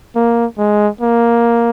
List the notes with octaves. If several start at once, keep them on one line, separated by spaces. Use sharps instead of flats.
A#3
G#3
A#3